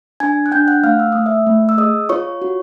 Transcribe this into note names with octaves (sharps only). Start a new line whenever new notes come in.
D4 G#5 G#6
F#6
D4 G5 G6
F#5 F#6
A3 F5 F6
E6
A3 D#6
E5 E6
A3
E6
G#4 D#5 D#6
F4 C#5 C#6
F#4